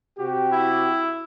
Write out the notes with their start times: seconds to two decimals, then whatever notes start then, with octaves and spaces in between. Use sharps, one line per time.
0.18 C3 F#4 G4
0.52 E4